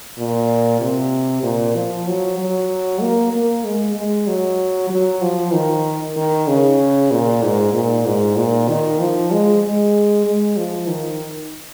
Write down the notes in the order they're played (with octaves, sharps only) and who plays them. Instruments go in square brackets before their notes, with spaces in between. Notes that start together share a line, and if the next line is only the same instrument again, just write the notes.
[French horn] A#2
C3
A#2
F3
F#3
F#3
A#3
A#3
G#3
G#3
F#3
F#3
F3
D#3
D#3
C#3
A#2
G#2
A#2
G#2
A#2
D#3
F3
G#3
G#3
G#3
F3
D#3